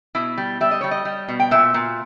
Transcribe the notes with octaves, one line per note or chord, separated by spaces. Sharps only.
B2 E4
G3
G3 E5
D#5
G3 C#5
D#5
G3
B2
G5
A#2 E5
A#2